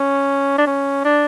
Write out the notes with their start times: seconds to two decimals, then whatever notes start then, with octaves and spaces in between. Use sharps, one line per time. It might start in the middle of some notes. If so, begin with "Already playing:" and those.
Already playing: C#4
0.58 D4
0.66 C#4
1.04 D4